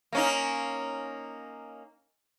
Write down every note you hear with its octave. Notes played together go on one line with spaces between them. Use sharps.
A#3 C#4 D#4